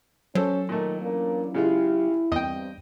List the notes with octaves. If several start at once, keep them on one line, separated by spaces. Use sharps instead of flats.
F#3 C#4 A4 C5
A#2 D#3 A3
E3 A#3 C#4 D4
C#3 G#3 E4 F4 G4
E2 G2 C4 D#5 G5